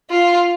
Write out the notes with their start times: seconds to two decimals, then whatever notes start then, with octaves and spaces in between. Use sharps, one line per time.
0.10 F4